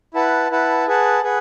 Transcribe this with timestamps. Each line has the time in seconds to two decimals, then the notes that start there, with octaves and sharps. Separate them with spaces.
0.14 E4 B4 F#5 A5
0.51 E4 B4 F#5 A5
0.87 G#4 B4 F#5 A5
1.23 G#4 B4 F#5